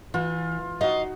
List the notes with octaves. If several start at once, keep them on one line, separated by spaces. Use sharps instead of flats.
E3 F4
D#4 F#4 D#5 F5